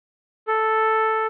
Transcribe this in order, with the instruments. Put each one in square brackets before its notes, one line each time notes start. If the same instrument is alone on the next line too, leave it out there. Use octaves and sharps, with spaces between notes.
[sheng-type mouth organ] A4